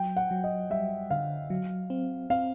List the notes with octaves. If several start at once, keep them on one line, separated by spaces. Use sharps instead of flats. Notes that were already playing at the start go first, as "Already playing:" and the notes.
Already playing: F#3 G5
F#5
F#3
D#5
G3 E5
D3 F5
F#3
C4
C4 F5